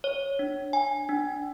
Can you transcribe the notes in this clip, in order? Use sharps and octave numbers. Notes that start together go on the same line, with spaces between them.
C#5
D4
G#5
D4